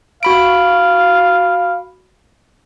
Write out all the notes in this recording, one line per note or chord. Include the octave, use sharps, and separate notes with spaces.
F#4 F5 B5 D7